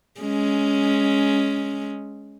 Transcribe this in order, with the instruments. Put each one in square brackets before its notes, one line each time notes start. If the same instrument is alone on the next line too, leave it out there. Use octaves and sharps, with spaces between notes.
[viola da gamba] G#3 C#4